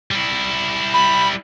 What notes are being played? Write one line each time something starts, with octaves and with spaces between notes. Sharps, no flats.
G3 E4
B5